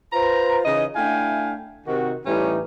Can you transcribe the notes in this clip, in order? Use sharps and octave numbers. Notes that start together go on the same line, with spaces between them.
F4 B4 C5 A#5
C#3 E3 D#4 D#5
A3 D4 E4 F5 G5 G#5
C3 D#3 F#4
A2 E3 G3 C#4 D#4 G4